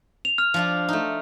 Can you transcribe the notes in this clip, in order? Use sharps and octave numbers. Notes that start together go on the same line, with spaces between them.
F7
F6
F3 D4 F4
A3 D#4